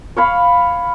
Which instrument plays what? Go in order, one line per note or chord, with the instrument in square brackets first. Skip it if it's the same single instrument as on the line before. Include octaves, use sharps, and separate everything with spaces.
[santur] C#5 F5 B5